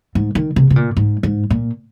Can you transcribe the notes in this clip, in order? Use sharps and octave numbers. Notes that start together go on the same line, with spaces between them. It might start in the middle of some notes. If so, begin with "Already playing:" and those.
G#2
D#3
C3
C3
A#2
G#2
G#2
A#2